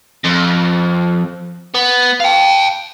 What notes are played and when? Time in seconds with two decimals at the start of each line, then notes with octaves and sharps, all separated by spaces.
0.24 F2
1.74 B3
2.20 F5 G5